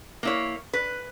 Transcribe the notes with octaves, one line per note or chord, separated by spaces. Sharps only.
A#3 E4 C#5
B4